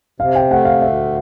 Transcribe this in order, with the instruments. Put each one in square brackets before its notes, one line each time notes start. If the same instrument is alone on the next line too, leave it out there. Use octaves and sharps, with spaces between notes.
[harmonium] C3 [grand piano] F5
[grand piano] G5
[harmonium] A3 [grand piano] F#5
[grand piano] F5
[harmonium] D2 [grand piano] E5